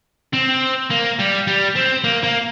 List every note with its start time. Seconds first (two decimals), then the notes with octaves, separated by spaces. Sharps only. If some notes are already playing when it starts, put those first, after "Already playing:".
0.33 C4
0.90 A#3
1.19 G3
1.47 G3
1.76 C4
2.04 A#3
2.23 A#3